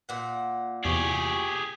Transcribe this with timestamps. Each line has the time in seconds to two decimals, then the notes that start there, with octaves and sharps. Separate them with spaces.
0.09 A#2 F#5
0.85 E2 C3 G4 G#4 C#6